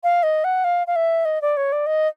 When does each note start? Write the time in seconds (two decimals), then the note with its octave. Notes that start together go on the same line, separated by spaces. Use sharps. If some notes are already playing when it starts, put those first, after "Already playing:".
0.04 F5
0.23 D#5
0.44 F#5
0.64 F5
0.87 F5
0.96 E5
1.25 D#5
1.42 D5
1.57 C#5
1.72 D5
1.86 D#5